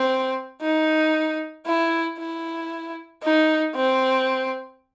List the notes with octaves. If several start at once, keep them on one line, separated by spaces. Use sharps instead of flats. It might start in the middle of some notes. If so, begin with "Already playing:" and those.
Already playing: C4
D#4
E4
E4
D#4
C4